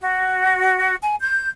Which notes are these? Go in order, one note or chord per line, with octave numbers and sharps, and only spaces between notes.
F#4
G#5
G6